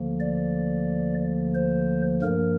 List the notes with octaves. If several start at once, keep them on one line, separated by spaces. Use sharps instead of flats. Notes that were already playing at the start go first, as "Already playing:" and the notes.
Already playing: D2 D3 F3 A#3
D5
C5
G2 F3 A#3 A#4